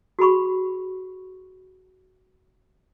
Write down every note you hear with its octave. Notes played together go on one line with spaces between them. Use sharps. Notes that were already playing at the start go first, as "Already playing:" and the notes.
F#4 G#4 B5 C#6